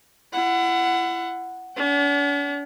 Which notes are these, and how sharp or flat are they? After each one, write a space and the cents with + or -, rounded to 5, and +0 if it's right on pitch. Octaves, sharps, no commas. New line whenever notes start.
E4 +35 F#5 +0
D4 -45 F#5 +40